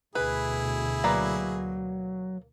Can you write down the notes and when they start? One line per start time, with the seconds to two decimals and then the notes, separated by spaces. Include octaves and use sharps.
0.15 D2 B2 E4 G#4 B4
1.04 F#3 A#3 B4 D5